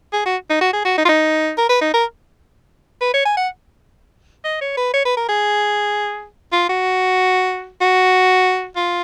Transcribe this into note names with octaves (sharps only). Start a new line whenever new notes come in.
G#4
F#4
D#4
F#4
G#4
F#4
D#4
F4
D#4
A#4
B4
D#4
A#4
B4
C#5
G#5
F#5
D#5
C#5
B4
C#5
B4
A#4
G#4
F4
F#4
F#4
F4